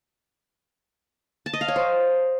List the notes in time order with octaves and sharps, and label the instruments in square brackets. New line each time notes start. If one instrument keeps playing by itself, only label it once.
[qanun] A5
D#5
F5
C#5
C5